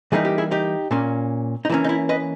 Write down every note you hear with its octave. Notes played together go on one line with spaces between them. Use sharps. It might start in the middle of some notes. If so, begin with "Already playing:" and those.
E3 G3 A#3 D#4 G#4
G4
E4 G#4
D#4 G4
A#2 A#3 C#4
D#4
E3 A#3 C#4 E4
D#4
E4
B4 D#5